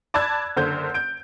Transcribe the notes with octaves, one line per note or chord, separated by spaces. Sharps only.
D5 A5 B5 E6 F#6 G#6
F#1 D3 C5 G6
G6 D7